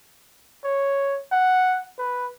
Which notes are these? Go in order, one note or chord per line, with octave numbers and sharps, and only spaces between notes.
C#5
F#5
B4